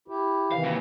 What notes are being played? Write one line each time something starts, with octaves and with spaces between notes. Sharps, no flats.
E4 G4
C3 D#3 E3 F5
A#3 F#4